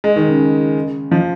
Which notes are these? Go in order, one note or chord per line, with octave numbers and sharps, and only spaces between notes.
G#3
D#3
C#3
F3